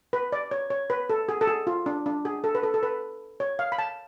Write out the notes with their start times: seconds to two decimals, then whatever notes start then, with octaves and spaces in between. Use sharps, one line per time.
0.13 B4
0.32 D5
0.51 C#5
0.70 C#5
0.90 B4
1.10 A4
1.29 G#4
1.41 A4
1.47 G#4
1.67 F4
1.86 D4
2.06 D4
2.25 G#4
2.44 A4
2.55 B4
2.63 A4
2.74 A4
2.83 B4
3.40 C#5
3.59 F5
3.72 B5
3.78 A5